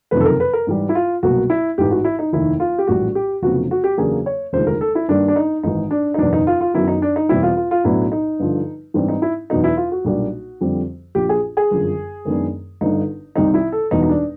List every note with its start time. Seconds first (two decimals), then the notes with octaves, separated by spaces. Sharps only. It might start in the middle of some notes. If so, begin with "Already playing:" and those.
0.11 F#1 F2 C3 D#3 B4
0.20 A4
0.25 A#4
0.40 B4
0.53 A#4
0.67 G#2 E3 G3
0.89 E4
0.95 F4
1.23 C2 B2 F#3 A#3 F#4
1.50 E4
1.78 A1 G#2 E3 G4
1.91 F#4
2.04 E4
2.19 D#4
2.33 F1 D#2 D#3 E4
2.60 F4
2.78 G4
2.87 A#1 A2 E3 G3 F#4
3.15 G4
3.42 F1 F2 C#3 F#3 B3 F#4
3.71 F#4
3.84 G4
3.98 E2 C#3 F#3 A#3 D4 G#4
4.26 C#5
4.53 F1 D#2 D3 F3 G#3 C5
4.67 A#4
4.81 A4
4.95 E4
5.08 G2 D#3 G3 A#3 D4
5.28 D4
5.36 D#4
5.63 G#1 G#2 E3 D#4
5.91 D4
6.14 D#4
6.18 F#1 E2 B2 D4
6.33 D#4
6.47 F4
6.61 F4
6.74 F#2 D#3 F#3 B3 E4
6.88 D#4
7.02 D4
7.16 D#4
7.29 E2 B2 G3 C4 E4
7.43 F4
7.57 F4
7.71 F4
7.84 B1 A2 F#3 B3 D4 E4
8.12 D#4
8.39 G2 D3 F3
8.94 G#2 E3 G3 C4 D4
9.08 D#4
9.22 E4
9.50 E2 B2 F#3 B3 D4 D#4
9.64 E4
9.77 F4
9.92 F#4
10.04 B1 A#2 G3 A#3 D4
10.61 F2 D3 G3 C4
11.15 A#1 A#2 F3 G4
11.29 G#4
11.57 G#4
11.71 G1 F#2 D3 F3
12.25 F#2 D#3 G#3 B3 D4
12.81 G1 G2 D3 D#4
13.35 C2 C3 D#3 G3 C4 D#4
13.54 E4
13.72 A4
13.91 E1 E2 B2 G3 D#4
14.03 D#4
14.09 D4